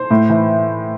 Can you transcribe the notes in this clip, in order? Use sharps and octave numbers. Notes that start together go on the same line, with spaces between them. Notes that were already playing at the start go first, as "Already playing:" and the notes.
Already playing: C5
A2
E3